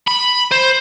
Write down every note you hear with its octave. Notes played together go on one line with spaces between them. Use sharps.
B5
C5